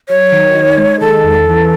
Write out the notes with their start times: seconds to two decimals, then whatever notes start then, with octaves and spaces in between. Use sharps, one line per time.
0.09 F#3 C#5
0.32 D#3
0.55 D#4
0.77 G#3
1.00 D#3 A4
1.23 E2
1.47 E3